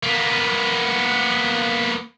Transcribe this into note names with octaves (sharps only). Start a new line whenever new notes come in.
A#3 B3